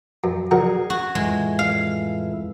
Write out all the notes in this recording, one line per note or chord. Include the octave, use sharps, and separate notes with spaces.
F#2
D3 F#3 G#4 A#4
F#4
F2 A2 E3 G#3
F5